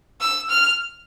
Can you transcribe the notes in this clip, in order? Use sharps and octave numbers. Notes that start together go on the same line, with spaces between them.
E6
F6